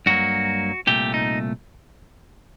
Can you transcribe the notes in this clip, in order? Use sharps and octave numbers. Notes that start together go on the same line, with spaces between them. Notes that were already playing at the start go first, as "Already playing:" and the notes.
G2 F#3 A#3 F#4
C2 A#2 A3 G4
D#4